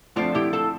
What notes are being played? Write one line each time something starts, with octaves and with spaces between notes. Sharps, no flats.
D3 F3 A3 C4 D4 F4
E4 G4
F4 A4